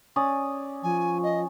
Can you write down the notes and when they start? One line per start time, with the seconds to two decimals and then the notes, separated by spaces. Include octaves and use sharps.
0.16 C#4 D5 D#6
0.83 F3 G#5
1.23 D#5